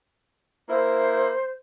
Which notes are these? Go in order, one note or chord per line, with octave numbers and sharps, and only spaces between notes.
A#3 E4 C5